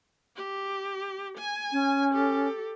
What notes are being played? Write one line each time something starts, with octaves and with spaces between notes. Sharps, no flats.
G4
G#5
C#4
G4 A4